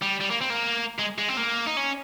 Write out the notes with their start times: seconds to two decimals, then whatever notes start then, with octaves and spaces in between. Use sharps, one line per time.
0.02 G3
0.20 G3
0.30 A#3
0.41 C4
0.50 A#3
0.99 G#3
1.19 G#3
1.29 C4
1.37 A#3
1.66 D#4
1.77 C#4